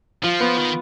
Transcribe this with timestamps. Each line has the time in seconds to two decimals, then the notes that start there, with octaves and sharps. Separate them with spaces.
0.23 F3 F4
0.40 B3
0.57 D#3